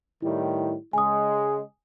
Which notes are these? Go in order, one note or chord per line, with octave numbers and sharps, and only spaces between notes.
A2 D#3 G3 E4
C#3 G#3 G#5 D#6